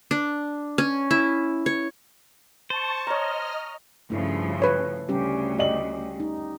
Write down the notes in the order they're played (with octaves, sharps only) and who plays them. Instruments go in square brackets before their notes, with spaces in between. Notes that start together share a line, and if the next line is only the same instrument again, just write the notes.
[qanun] D4
C#4
E4
C#5
[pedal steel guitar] C5 [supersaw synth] A5 C#6
[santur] C#5 A#5 [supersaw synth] D#5 F6
[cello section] G2 C#3 F3 [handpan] A3 E4
[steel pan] B4 C#5
[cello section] D2 C#3 [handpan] G3 C#4 G4
[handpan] G4 [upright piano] D5 D#5 F#7
[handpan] D#4